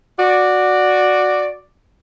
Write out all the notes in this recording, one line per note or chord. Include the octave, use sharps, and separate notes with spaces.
F#4 D5